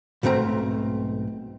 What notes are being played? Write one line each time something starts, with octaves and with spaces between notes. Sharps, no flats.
B1 G#2 A3 C4 A#5